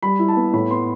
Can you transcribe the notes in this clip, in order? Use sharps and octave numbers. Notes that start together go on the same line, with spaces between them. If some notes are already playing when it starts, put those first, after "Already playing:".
G3 B5
E4
A5
B3
A2 B5
B3 C6